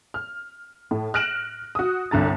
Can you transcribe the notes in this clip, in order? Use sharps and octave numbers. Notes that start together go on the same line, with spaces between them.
F6
A2
F6 F#6 A#6 D7 E7 F#7
F#4 D#6
G1 C2 D3 A#5 A6